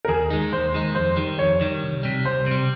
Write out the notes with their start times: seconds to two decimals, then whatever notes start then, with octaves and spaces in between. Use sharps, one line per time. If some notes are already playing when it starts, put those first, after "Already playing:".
0.05 A#4
0.08 D#2 G#4
0.30 D#3 G#3 D#4
0.52 D#2 C5
0.74 D#3 G#3 D#4
0.95 F2 C5
1.16 D#3 G3
1.39 F2 C#5
1.61 D#3 G3
1.82 C2
2.03 C3 G3
2.25 C2 C5
2.47 C3 G3